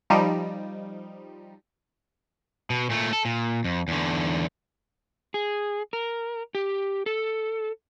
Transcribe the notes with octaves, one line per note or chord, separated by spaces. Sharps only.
F3 G3 D#4
B2
A#2 A3
A4
A#2
F2
E2 D3
G#4
A#4
G4
A4